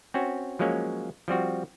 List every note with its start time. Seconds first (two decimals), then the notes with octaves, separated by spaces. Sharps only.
0.14 C4 C#4 F#4
0.59 F3 F#3 G#3 A#3 C#4
1.28 F3 G3 C4 F#4